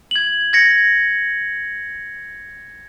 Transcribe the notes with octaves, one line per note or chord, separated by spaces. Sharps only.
G#6 F#7
G#6 A#6 C#7